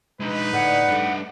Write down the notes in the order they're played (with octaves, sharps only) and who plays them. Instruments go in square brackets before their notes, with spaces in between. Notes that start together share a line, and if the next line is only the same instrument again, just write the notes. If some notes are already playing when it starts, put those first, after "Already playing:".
[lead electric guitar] G#3 D4 [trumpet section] D#4 B4
[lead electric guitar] A2 [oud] D3 [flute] F#5
[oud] G2 A3 [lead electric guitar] D4 D#5